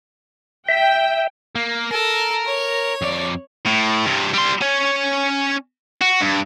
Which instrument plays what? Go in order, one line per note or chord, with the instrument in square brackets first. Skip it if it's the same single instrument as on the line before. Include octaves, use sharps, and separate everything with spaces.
[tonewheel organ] E5 [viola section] G5
[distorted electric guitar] A#3
[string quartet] A4 [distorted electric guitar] A#4
[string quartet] C#5
[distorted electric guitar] F2 D5
A2
G2 C3
G3 C6
C#4 C#5
F#4
G2